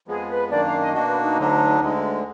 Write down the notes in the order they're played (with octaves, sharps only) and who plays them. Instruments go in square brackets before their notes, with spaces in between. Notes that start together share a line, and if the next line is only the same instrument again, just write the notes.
[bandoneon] F2 F3 G#3 B3 [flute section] G#4
[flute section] B4
[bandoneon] F#2 D#3 A#3 D4 [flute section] D5
[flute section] F5
D#5
[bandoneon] B2 A#3 D4 F#4 [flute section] D#5
[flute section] B4
D#4
[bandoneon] D2 D3 F#3 D4
D2 D3 G#3